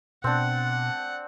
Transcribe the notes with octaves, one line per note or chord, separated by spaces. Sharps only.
B2 C4 D4 F#5